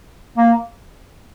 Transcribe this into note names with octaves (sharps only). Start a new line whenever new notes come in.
A#3